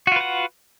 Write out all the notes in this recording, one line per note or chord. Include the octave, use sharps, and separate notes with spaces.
F4 F#4 B4 F#5